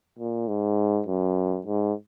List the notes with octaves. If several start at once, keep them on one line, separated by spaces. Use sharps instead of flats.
A#2
G#2
F#2
G#2